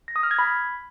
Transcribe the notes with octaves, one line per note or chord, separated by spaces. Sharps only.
A#6
D#6
F6
G#6
B5